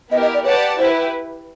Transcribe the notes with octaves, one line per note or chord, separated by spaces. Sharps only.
B3 E4 G4 A#4 D#5
D#5
D5
G4 B4 C#5 D5 F#5 A5
E4 G4 B4 C5